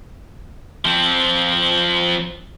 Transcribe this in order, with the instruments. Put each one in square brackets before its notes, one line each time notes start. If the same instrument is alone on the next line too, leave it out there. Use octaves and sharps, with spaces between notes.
[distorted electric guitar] F3 C4